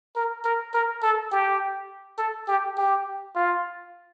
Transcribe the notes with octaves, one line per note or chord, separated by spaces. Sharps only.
A#4
A#4
A#4
A4
G4
A4
G4
G4
F4